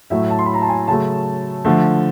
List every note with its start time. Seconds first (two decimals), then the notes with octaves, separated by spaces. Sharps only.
0.10 A2 F#3 A3 E5
0.30 A5
0.39 C6
0.46 B5
0.54 A#5
0.62 A5
0.69 G#5
0.87 C#3 F#3 A3 A5
1.65 D3 F3 A3